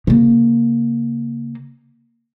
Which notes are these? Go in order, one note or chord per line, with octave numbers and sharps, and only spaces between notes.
C#3 A#3